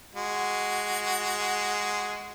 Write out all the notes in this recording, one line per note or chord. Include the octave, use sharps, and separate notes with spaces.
G#3 F#4